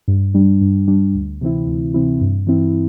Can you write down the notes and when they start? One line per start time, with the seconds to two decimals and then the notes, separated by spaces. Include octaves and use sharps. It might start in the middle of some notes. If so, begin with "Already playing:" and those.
0.08 G2
0.34 G3 D4
0.61 G2
0.88 G3 D4
1.15 D2
1.41 C3 E3 C4 E4
1.67 D2
1.94 C3 E3 C4 E4
2.21 G2
2.47 E3 C4 E4